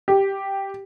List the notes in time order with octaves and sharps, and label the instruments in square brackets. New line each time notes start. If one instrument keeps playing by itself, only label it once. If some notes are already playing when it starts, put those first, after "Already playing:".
[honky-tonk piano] G4